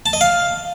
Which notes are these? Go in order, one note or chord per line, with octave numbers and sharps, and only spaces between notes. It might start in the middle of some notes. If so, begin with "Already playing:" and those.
A5
D#5
F5